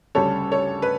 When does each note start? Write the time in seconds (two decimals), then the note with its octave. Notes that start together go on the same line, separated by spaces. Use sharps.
0.15 D2 C#3 G3 A4 C#5
0.51 A4 C#5
0.82 B4